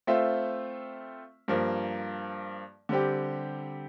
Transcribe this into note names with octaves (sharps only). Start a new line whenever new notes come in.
A3 C4 F4 C5 E5
G2 F3 A#3
D3 G3 C4 G4